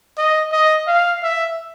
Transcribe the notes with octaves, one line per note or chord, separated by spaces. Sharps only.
D#5
D#5
F5
E5